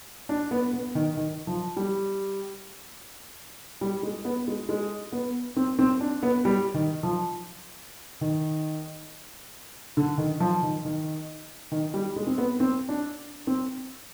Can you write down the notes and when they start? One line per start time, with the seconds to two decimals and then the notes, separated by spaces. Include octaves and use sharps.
0.29 D4
0.51 B3
0.73 B3
0.95 D#3
1.17 D#3
1.47 F3
1.77 G3
3.81 G3
4.03 G#3
4.25 B3
4.48 G#3
4.69 G#3
5.12 B3
5.57 C4
5.79 C4
6.01 D4
6.23 B3
6.45 G3
6.74 D#3
7.03 F3
8.21 D#3
9.97 D3
10.18 D#3
10.40 F3
10.63 D#3
10.85 D#3
11.72 D#3
11.94 G3
12.16 G#3
12.27 C4
12.38 B3
12.60 C4
12.89 D4
13.47 C4